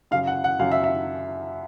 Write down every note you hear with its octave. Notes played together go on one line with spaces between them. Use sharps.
F#2 C#3 F#3 F5
F#5
F#5
F#2 C#3 F#3 F5
E5
E5